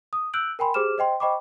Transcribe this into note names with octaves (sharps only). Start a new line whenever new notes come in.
D#6
E6 F#6 G6 D7 F#7
A#4 G5 G#5 B5 C6
G4 G#4 C5 D6 F6 E7
C5 D#5 G5 C6
C5 D#5 G5 B5 C#6 D6